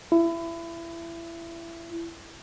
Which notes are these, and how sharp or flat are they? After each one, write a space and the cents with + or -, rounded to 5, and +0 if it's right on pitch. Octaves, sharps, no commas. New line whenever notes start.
E4 +25